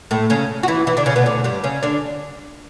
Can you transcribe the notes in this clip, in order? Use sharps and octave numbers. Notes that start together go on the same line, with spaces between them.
A2 A3
C#3 C#4
F#4
E3 E4
E3 E4
D3 D4
C#3 C#4
B2 B3
D2 D3
G2 G3
C#3 C#4
D3 D4